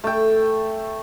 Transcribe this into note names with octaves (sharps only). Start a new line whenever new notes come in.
A3 G5